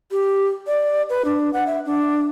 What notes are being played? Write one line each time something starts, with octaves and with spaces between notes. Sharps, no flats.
G4
D5
B4
D4
F#5
E5
D4